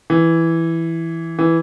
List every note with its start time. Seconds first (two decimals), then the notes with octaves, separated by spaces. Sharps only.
0.10 E3
1.39 E3